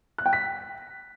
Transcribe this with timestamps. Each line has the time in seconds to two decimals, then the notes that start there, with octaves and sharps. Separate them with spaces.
0.18 F#6
0.26 G5
0.33 B6